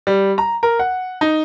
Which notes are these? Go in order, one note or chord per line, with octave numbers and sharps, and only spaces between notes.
G3
A#5
A#4
F#5
D#4